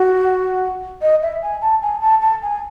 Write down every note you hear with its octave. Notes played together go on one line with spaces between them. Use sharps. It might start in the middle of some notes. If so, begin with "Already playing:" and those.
Already playing: F#4
D#5
E5
G#5
A5
G#5
A5
A5
G#5